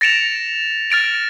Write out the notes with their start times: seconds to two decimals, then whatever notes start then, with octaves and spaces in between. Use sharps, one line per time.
0.01 A6 A#6 C#7 D7 E7 F7
0.90 F6 A6 D7 F7